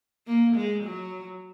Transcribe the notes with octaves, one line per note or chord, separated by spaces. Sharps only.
A#3
G#3
F#3